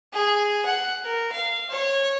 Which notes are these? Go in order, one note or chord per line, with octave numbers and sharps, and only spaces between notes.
G#4
F#5
A#4
F5
C#5